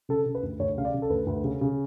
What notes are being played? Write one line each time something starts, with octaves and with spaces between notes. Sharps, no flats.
C#3 A4
C#3
B4
D2
D2 C#5
C#3 F5
D5
C#3
A4
D2 B4
D2
C#3
C#3